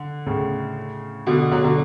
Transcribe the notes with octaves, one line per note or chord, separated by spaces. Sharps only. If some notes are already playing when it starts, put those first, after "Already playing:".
Already playing: D3
A2 C#3
B2 D3
D3 F#3
D3 F#3